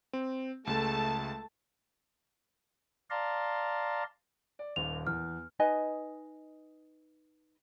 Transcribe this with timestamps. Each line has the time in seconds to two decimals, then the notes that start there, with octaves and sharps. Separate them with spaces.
0.13 C4
0.67 C#2 G#3 A3 A5
3.10 D5 F5 A5 A#5 C6
4.59 D5
4.76 D#1 D#2 F7
5.07 E2 F6
5.59 D#4 B4 D#5 G#5